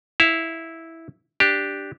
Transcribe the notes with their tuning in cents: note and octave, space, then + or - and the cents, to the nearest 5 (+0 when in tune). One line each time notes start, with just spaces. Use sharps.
E4 -10 F5 +0
D4 +0 G4 +0